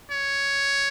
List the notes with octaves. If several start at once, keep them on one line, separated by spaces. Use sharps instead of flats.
C#5